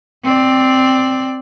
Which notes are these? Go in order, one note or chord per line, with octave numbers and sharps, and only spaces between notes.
C4 D5